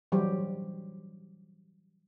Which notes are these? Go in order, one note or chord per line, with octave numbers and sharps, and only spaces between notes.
E3 F#3 G3 G4 C5